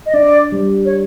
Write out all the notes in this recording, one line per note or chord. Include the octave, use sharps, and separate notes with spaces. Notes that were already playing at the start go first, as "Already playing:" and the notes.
D#5
D4 D5
G3
C#5